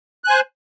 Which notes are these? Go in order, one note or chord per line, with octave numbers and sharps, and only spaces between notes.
C5 G#5 F#6